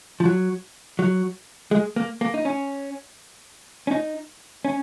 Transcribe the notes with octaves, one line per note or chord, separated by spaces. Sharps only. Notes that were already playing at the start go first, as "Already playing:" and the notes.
F3
F#3
F#3
G#3
A#3
A#3
D#4
C#4
C#4
D#4
C#4